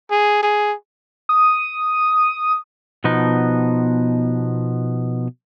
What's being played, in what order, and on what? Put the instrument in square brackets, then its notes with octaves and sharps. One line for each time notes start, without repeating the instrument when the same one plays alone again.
[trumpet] G#4
G#4
[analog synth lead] D#6
[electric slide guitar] B2 F3 B3 D#4